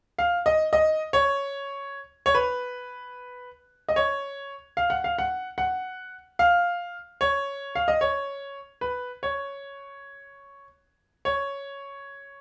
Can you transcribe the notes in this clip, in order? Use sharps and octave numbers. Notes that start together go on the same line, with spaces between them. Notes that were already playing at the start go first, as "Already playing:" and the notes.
F5
D#5
D#5
C#5
C#5
B4
D#5
C#5
F5
F#5
F5
F#5
F#5
F5
C#5
F5
D#5
C#5
B4
C#5
C#5